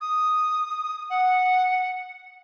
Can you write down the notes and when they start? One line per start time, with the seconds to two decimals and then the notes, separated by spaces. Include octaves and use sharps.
0.01 D#6
1.10 F#5